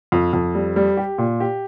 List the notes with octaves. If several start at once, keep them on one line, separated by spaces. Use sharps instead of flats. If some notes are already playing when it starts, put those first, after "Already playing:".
F2
F2
G3
G3
G4
A#2
G4